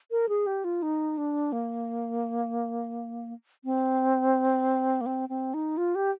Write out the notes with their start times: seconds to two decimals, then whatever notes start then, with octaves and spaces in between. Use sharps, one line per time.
0.11 A#4
0.29 G#4
0.46 G4
0.64 F4
0.82 D#4
1.17 D4
1.52 A#3
3.64 C4
5.01 A#3
5.06 C4
5.29 C4
5.54 D#4
5.77 F4
5.95 G4